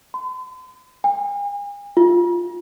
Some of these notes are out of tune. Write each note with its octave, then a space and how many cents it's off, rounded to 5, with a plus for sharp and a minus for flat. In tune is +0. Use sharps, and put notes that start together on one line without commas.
C6 -45
G#5 -40
F4 +0